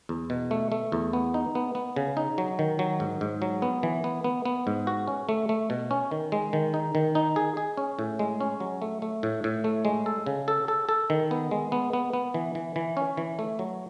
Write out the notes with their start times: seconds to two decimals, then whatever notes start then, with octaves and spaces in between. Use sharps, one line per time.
0.09 E2
0.30 B2
0.51 A3
0.72 A3
0.92 E2
1.13 B3
1.34 D#4
1.55 B3
1.75 B3
1.96 C#3
2.17 D#4
2.38 F#3
2.59 D#3
2.79 F#3
3.00 G#2
3.21 G#2
3.42 F#3
3.62 B3
3.83 E3
4.04 B3
4.24 B3
4.45 B3
4.67 G#2
4.87 F#4
5.08 C#4
5.29 A3
5.49 A3
5.70 B2
5.91 C#4
6.11 D#3
6.32 G#3
6.53 D#3
6.74 D#4
6.95 D#3
7.15 D#4
7.36 G#4
7.57 G#4
7.77 C#4
7.99 A2
8.19 G#3
8.41 C#4
8.60 F#3
8.82 A3
9.02 A3
9.23 A2
9.44 A2
9.64 A3
9.85 G#3
10.06 A4
10.26 C#3
10.48 A4
10.68 A4
10.89 A4
11.10 D#3
11.31 B3
11.51 G#3
11.72 B3
11.93 B3
12.13 B3
12.34 E3
12.55 E3
12.76 E3
12.97 C#4
13.17 E3
13.39 A3
13.59 F#3